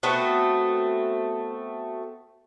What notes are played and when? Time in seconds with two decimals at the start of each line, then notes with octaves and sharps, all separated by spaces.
0.03 A3 B3 C4 F#4